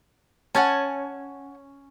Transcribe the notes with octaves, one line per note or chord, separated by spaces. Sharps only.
C#4 F#5 G#5 A5